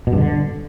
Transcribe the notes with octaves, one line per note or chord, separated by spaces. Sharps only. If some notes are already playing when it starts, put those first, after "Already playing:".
B2
G2
D3